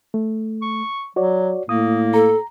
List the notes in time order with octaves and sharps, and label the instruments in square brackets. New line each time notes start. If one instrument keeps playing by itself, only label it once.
[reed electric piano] A3
[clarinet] C#6
[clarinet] F#3 [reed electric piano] F#4 C#5 D5
[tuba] A2 [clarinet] A#3 [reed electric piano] D#6
[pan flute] A4 [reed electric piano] A#5